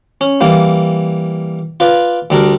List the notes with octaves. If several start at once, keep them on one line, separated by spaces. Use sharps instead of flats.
C#4
E3 G3 A#3
F4 B4 D5
D2 G3 D4 A#4